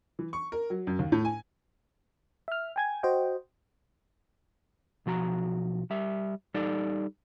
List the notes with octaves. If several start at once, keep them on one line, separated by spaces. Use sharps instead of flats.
E3
C#6
A#4
F#3
F#2
D#2
A2
G#5
E5 F6
G5 G#5 G#6
F#4 C5 D#5 G5
B1 F3 F#4 A#5
G3 E5
G3 D#4 A4 D5